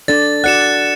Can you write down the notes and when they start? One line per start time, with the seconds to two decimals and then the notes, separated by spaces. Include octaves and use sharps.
0.08 D4 A4 D5 A6
0.44 F#4 D5 F#5 F#6 C#7 E7